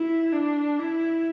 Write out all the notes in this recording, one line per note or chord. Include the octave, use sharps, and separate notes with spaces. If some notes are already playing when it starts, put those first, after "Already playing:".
Already playing: E4
D4
E4